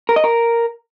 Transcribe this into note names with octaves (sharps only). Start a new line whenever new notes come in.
A#4
D#5
A#4